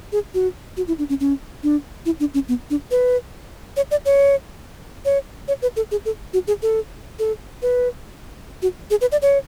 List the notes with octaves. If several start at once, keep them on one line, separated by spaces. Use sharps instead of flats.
G#4
F#4
F#4
E4
D4
C#4
C#4
D4
E4
D4
C#4
B3
D4
B4
C#5
D5
C#5
C#5
C#5
B4
A4
G#4
A4
F#4
G#4
A4
A4
B4
F#4
G#4
B4
D5
C#5